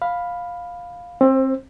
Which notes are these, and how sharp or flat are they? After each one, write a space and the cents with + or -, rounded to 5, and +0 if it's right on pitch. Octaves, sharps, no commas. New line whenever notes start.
F5 +10 B5 +0
C4 +25 C5 +0